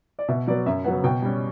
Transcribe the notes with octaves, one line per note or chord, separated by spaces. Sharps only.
D5
B2 E5
F#3 B3 D5
F#2 E5
C#3 F#3 B3 F#5
B2 G5
G3 C#4